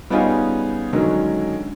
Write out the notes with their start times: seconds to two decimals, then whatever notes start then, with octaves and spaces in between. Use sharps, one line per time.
0.10 G3 B3 C#4 D#4 F4 G#4
0.93 D3 D#3 F#3 G#3 C#4 A#4